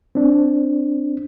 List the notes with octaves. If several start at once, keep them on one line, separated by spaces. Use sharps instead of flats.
C4 D4